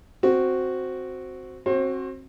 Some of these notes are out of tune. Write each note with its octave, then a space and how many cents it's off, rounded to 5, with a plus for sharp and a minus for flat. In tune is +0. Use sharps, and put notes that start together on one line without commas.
C4 +0 F#4 +0
C4 +30 F#4 +0 C5 +35